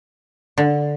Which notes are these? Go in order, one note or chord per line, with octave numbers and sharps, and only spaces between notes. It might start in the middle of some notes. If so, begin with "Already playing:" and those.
D3